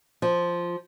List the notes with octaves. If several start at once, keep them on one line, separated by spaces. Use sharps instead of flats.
F3